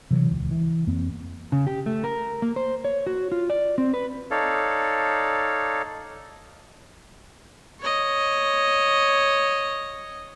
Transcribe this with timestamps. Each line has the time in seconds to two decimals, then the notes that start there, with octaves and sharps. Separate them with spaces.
0.11 C3 E3 F#3
0.30 D#1 C#2
0.51 E3
0.87 F2 A#3 C4
1.52 C#3
1.67 G4
1.86 A3
2.04 A#4
2.42 A#3
2.56 C5
2.85 C#5
3.07 F#4
3.32 F4
3.50 D5
3.78 C4
3.94 B4
4.31 D#4 A4 C#5 D5 F5
7.79 C#5 D#5